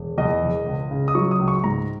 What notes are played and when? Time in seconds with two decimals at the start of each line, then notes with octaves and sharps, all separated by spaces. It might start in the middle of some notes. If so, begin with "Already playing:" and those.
Already playing: E1
0.18 E2 D#5
0.42 E1
0.66 C#2
0.91 C#3
1.08 D#6
1.15 F#3 C#6
1.31 D#6
1.39 C#2
1.48 C#6
1.64 G#2 A#5